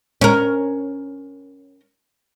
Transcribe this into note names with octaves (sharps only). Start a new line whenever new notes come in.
C#4 A#4